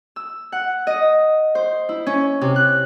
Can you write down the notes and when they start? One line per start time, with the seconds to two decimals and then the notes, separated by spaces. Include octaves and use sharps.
0.16 E6
0.52 F#5
0.87 D#5
1.55 C5
1.89 E4
2.06 C#4
2.41 C3
2.56 F#6